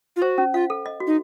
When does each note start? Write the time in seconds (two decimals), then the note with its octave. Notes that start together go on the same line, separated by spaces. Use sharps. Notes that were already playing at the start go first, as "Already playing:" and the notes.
0.16 F4
0.22 F#4 C5
0.38 C#4
0.53 F4 F5
0.70 A4
0.86 D#5
1.00 F#4
1.07 D#4